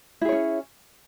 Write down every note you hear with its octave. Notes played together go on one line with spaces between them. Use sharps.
C#4 E4 G#4 C#5